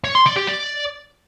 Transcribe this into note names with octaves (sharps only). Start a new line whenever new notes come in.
C#5
C6
D5
G4
D5